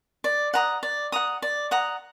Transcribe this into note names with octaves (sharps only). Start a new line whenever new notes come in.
D5
F#5 A#5 D#6
D5
F#5 A#5 D#6
D5
F#5 A#5 D#6